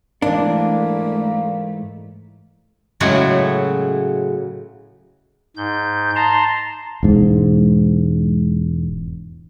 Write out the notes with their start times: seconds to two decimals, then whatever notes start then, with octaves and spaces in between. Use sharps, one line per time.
0.22 G#2 E3 A3 A#3 D4
3.00 A2 C#3 F#3 G#3 E4 F#4
5.57 G#2 G6
6.16 A5 A#5 C6
7.03 E1 G#2